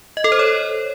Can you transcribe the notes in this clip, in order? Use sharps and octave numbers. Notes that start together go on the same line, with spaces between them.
D#5
A4
C5
C#5